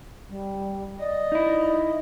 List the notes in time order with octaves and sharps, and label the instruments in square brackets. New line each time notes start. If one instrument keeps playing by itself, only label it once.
[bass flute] G3
[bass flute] D5 [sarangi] D#5
[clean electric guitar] D#4 E4